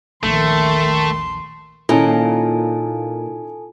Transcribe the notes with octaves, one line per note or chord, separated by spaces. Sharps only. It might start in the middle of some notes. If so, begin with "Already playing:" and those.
A#1 E2 D#3 A3 C6
A#2 D#3 C#4 D#4 E4 A4 G#5 A5